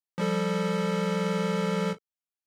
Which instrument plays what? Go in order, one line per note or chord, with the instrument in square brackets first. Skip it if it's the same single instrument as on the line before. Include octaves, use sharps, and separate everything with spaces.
[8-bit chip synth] F3 G3 A4